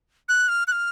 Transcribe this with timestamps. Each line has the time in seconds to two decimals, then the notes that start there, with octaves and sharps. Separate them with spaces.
0.29 F#6
0.48 F6
0.68 F#6
0.72 F6